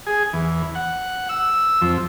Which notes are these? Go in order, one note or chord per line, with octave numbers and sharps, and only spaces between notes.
G#4
E2
F#5
E6
F2